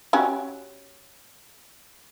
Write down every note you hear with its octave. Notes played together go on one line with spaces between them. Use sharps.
C#4 F#4 G4